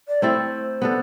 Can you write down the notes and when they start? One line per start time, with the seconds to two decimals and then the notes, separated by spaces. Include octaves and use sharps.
0.08 D5
0.22 A3 C4 E4 A4 C5
0.82 B3 D4 A4